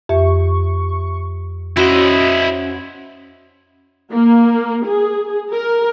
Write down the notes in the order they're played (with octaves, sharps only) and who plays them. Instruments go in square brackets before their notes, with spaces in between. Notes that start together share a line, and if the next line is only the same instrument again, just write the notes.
[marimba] F2 G4 E5 [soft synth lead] C#6
[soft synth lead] C#4 [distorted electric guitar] E4 D#5 [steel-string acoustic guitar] F#4 C5
[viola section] A#3
G#4
A#4